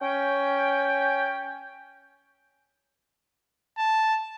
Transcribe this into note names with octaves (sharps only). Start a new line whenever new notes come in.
C#4 G5
A5